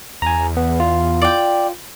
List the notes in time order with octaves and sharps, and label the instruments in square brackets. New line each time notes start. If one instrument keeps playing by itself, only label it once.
[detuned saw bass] E2 [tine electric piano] G#5 A#5
[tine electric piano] B3
F4
[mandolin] D5 G5